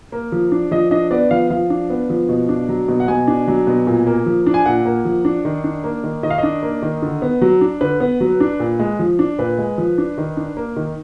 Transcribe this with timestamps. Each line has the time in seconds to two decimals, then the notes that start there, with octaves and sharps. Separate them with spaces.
0.12 A#3
0.32 F3
0.52 D4
0.71 F3 D#5
0.91 D4 D#5
1.11 B3 D5
1.31 F3 F5
1.50 F3 F5
1.70 D4
1.90 B3
2.10 F3
2.29 B2
2.49 D4
2.69 F#3
2.88 B2
3.00 F#5
3.08 B2 G#5
3.28 D4
3.48 F#3
3.67 B2
3.87 A#2
4.07 A#3
4.26 F3
4.47 D4
4.54 G#5
4.66 A#2 F#5
4.85 A#3
5.05 F3
5.25 D4
5.45 D#3
5.64 D4
5.84 A#3
6.03 D#3
6.23 D#3 D#5
6.30 F5
6.38 D4 D#5
6.63 A#3
6.82 D#3
7.02 D3
7.22 B3
7.42 F#3
7.61 D4
7.81 D3 B4
8.00 B3
8.21 F#3
8.40 D4
8.60 A#2
8.80 G#3
8.99 F3
9.19 D4
9.38 A#2 B4
9.58 G#3
9.78 F3
9.98 D4
10.18 D#3
10.37 D4
10.57 A#3
10.76 D#3